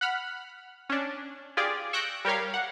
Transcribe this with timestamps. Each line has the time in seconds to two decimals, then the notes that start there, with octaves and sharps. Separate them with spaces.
0.01 F#5 B5 F6
0.89 C#4 D4
1.57 F4 G4 G#4 D5
1.93 C#6 E6 F#6 G6 A#6 D7
2.25 G3 G4 A#4 C#5 F5
2.54 F#5